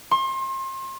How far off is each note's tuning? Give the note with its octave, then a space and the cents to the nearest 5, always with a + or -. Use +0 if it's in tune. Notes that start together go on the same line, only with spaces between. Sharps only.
C6 +35